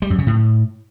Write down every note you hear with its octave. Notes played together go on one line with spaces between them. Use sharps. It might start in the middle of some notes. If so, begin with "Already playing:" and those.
G3
F#2
C#3
A2